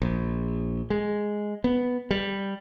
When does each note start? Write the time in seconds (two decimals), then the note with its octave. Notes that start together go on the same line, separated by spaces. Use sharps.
0.02 A#1
0.90 G#3
1.64 B3
2.11 G3